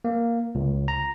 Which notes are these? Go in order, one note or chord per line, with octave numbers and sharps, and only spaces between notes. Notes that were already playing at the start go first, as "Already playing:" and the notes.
A#3
C#2
A#5